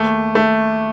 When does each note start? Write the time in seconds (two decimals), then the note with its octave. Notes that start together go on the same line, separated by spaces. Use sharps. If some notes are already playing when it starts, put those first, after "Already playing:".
Already playing: D#2 A3
0.35 A3